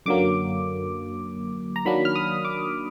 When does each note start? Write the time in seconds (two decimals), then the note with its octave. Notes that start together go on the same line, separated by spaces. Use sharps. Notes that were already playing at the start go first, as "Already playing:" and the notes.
0.06 F#2 D3 F#3 A#3 D6
1.76 A#5
1.85 D#3 F#3 A#3 D4 B5
2.05 F6
2.15 D#6
2.45 D6